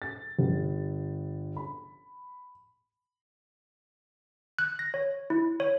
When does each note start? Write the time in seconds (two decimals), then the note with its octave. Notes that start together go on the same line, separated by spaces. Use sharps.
0.02 A6
0.39 G1
1.57 B5
4.59 F#6
4.79 A#6
4.94 C#5
5.30 E4
5.60 C#5